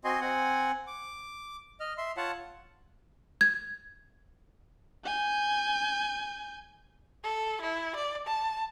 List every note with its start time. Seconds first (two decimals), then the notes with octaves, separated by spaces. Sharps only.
0.04 C4 F#4 D#5 G#5 C6
0.21 C4 F#5 G#5
0.87 D6
1.80 D#5 F6
1.98 E5 C6
2.17 F4 C#5 F#5 A5
3.41 G#6
5.05 G#5 G6
7.24 A4
7.61 E4
7.96 D5
8.27 A5